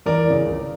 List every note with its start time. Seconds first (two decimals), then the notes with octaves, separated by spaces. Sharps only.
0.06 E2 A#4 D5
0.26 C#3 E3
0.46 C#2